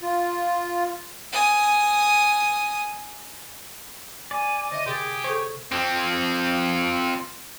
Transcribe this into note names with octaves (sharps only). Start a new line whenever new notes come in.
F4
G#5 D#6
D5 G#5
D3 D#5 E5
C3 G4 G#4 A6
A4 C5 C#5
F3 C4